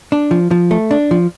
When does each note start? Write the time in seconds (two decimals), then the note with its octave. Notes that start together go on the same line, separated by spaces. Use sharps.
0.12 D4
0.31 F3
0.51 F3
0.71 A3
0.91 D4
1.11 F3